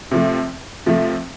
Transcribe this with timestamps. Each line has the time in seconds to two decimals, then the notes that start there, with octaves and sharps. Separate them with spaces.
0.11 C3 F3 A3
0.86 C3 F3 A3